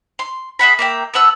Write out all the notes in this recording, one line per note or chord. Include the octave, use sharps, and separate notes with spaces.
C6
G#4 E5 F#5 B5
A#3 E5 G5
B3 A4 F#5 E6